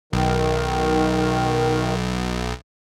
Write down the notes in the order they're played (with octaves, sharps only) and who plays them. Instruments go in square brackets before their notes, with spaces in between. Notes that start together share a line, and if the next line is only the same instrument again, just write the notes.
[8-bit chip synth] B1 [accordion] D#3